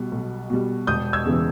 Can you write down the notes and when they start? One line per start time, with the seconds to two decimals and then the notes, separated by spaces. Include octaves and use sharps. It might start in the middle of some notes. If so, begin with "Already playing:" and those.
Already playing: B1 B2 G3
0.12 B1
0.50 B2 G3
0.87 E1 D#6 G6
1.13 E6 G#6
1.25 E2 C#3 E3